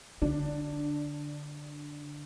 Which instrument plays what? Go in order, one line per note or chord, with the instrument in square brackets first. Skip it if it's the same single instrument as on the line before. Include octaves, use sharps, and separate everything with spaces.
[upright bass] D3 [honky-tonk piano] D4